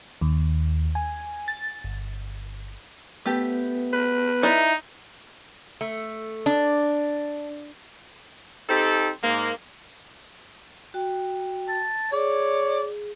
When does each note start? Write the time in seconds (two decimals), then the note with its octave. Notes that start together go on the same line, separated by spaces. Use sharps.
0.21 D#2
0.95 G#5
1.48 A6
1.84 G1
3.26 A3 B3 G4
3.93 B4
4.43 D#4 E4 D5 E5
5.81 A3
6.46 D4
8.68 C4 D#4 G4 A4
9.23 G#2 A#3
10.94 F#4 G5
11.68 A5
12.12 G#4 C#5 D5